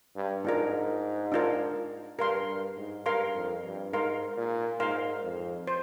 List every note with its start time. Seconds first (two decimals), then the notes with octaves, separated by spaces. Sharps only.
0.16 G2
0.44 G#2 D4 F4 A#4
1.32 D4 F4 A#4
2.19 G2 A#4 F5 C6
2.48 G2
2.77 G#2
3.06 G2 A#4 F5 C6
3.35 F2
3.64 G2
3.92 G#2 A#4 F5 C6
4.37 A#2
4.80 G#2 A#4 F5 C6
5.23 F2
5.67 C5